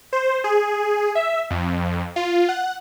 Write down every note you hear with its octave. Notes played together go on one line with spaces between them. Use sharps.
C5
G#4
E5
F2
F4
F#5